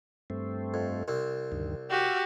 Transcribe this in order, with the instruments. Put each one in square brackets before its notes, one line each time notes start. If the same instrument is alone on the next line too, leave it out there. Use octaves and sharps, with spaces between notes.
[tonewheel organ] G2 A3 C4
[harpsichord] F2
C2 C4
[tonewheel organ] D2 G2 D#3
[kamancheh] F#4 G4 [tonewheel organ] F5 E6